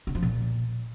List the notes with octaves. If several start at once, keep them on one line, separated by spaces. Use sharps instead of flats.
D3
F3
A#2